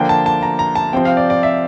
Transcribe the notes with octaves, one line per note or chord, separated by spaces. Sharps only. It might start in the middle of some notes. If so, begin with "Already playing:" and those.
Already playing: D3 F3 A#3 D4 G5
A5
A5
A#5
A#5
A5
C3 F3 C4 G5
F5
D5
D5
E5